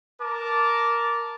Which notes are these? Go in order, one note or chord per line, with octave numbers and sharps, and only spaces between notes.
A#4 A5 D6